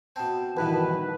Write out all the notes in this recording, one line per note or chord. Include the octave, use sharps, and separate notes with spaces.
B2 C4 A5
A#1 G2 B2 D#3 E3 B4